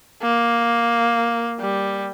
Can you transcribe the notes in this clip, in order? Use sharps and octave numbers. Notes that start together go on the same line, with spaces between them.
A#3
G3